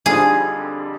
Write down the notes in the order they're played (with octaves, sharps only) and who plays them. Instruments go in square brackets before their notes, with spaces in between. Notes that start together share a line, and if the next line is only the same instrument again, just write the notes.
[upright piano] F2 D3 G3 D4 F4 [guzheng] G#4